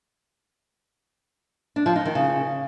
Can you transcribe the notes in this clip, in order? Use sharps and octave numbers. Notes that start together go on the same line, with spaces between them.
D4
F3
D#4
D#3
C#3